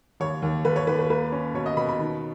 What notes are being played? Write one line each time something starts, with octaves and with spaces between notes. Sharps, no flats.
D#2 C#5
D#2
D#2 B4
C#5
D#2 B4
B4
A#3 B4
C#4
B2 C#5
D#5
B2 B5
B5
D#3